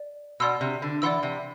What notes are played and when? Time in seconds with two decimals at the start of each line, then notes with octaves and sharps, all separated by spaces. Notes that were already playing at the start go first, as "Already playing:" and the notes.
Already playing: D5
0.40 B2 D5 F#5 C6 E6
0.61 C3
0.82 D3
1.02 E3 D5 F#5 C6 E6
1.23 C3